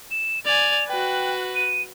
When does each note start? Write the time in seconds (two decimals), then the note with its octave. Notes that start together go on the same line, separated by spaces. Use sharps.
0.11 E7
0.45 D5 G#5 F7
0.89 F#4 B4 G5
1.55 D#7